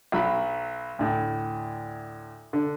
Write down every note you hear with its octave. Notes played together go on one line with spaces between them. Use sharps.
B1 F#3 B5
D2 A2
D3